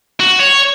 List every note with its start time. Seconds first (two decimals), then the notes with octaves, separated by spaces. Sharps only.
0.20 F#4
0.40 C#5